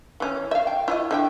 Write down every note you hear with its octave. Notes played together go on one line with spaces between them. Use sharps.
E3 C#4
E5 F5
G5
E4 F4 D#5
D3 E5 G5